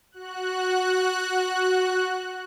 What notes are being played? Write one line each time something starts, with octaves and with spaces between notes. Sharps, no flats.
F#4 F#6